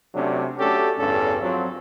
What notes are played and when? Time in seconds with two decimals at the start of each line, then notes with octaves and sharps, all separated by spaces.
0.14 C3 F#3 A3 C#4 D4
0.58 A3 C#4 D4 F#4 G4 A4
0.99 A1 E2 G2 D3 C#4 A4
1.42 F3 F#3 C4